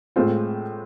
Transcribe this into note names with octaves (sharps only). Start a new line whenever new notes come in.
A2 G#3 C4 F4